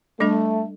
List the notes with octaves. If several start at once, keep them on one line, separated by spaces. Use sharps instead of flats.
G3 A3 D4 A4